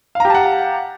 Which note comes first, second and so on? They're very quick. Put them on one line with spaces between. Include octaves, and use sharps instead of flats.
F5 A#5 G4 A5 F#5